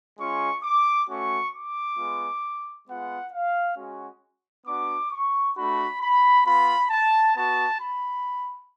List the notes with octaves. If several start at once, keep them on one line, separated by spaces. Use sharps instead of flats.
G#3 C#4 F4 C#6
D6
A3 C#4 F#4 C#6
D6
G#3 B3 F4
G#3 B3 F4 F#5
F5
G#3 C#4 F#4
B3 D4 F#4 D6
C#6
A3 D4 F#4 B5
B5
B3 F4 B5
A5
B3 F#4 A5
B5